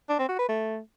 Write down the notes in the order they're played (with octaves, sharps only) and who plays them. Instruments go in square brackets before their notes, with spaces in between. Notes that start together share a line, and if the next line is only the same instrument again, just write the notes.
[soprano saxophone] D4
C4
F#4
B4
A3